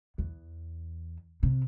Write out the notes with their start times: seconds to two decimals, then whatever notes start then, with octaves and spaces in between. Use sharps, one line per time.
0.18 E2
1.43 C3